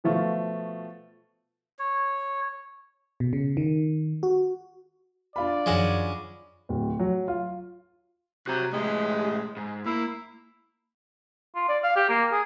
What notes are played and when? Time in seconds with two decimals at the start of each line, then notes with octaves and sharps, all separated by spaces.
0.04 B2 F3 A3 F5 C#6
1.79 C#5
3.20 B2
3.33 C#3
3.57 D#3
4.23 F#4
5.36 D4 F4 D5 B5
5.66 F#2 D#3 F3 G#3 C#4 F#4
6.69 D1
6.99 F#3
7.28 F4
8.47 C3 F#4 A#5
8.73 A2 G#3 G4
9.57 G#2
9.86 A#3 E4
11.55 F4
11.69 D5
11.84 F5
11.96 G4
12.09 A#3
12.32 G#4